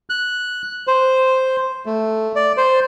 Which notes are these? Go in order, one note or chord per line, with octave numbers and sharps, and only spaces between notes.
F#6
C5
A3
D5
C5